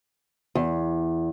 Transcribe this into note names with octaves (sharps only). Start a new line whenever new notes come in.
E2